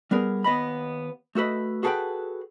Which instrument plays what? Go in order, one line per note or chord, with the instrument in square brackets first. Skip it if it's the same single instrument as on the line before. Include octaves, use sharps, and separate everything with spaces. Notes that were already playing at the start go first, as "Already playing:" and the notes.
[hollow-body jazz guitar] G3 B3 G#4 A#4
D#2 B3 D#5 B5
A3 F#4 A4 B4 D#5
F#4 G#4 A4 B4 F#5 G5